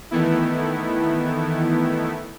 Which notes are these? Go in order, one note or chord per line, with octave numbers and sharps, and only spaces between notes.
D#3 E3 A3 B3 E4